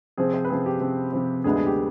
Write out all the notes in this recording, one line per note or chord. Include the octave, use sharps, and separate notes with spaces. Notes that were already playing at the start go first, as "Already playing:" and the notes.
C3 F3 C4 G#4
C5
B4
C3 F3 C4 G#4
G4
C3 F3 C4
C3 F3 C4
D2 D3 G#3 B3 D4 G#4
G#4
G4